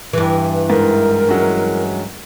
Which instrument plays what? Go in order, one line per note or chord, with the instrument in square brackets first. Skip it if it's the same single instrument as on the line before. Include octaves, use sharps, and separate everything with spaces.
[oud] G2 E3
[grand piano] G#2 [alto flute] A#4
[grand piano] F#3 G#3 C#4